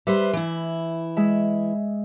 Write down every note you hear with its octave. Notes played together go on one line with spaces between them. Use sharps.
G3 B4 C5 E5
E3 E4
G#3 E5